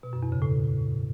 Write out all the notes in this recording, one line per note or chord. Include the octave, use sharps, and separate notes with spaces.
B2
F#2
E2
C#3
A2